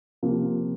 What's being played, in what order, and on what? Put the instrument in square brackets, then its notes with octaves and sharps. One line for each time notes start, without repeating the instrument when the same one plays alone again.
[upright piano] C3 F3 A#3